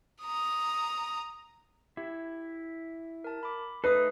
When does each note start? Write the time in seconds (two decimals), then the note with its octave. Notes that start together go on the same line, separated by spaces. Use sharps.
0.22 A#5 D#6
1.97 E4 G4
3.24 A#4 A5
3.43 B5 D6
3.84 A3 D#4 A4 B4 D#6 C7